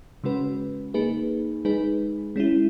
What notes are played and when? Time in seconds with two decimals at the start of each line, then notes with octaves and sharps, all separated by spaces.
0.24 C#3 G#3 C#4 F#4 B4
0.94 A#3 D#4 G#4 B4
1.65 G#3 D#4 G#4 B4
2.36 G#3 C#4 E4